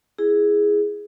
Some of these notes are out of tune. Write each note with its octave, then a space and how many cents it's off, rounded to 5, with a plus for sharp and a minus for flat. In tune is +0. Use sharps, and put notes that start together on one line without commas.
E4 +0 G#4 +0